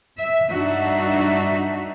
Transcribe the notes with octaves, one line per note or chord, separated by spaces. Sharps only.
E5
G2 D4 D#4 F#4 E5